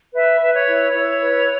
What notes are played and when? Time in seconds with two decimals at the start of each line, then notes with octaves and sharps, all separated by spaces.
0.15 B4 E5
0.40 B4
0.54 C#5
0.67 E4
0.92 E4 C#5
1.19 B4